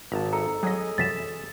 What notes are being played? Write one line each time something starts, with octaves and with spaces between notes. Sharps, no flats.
G#1 A5 A#5
A4 D#5 A#5 C#7
F#3 G#4 D#5 A#6
F#2 C3 E3 A6 B6 E7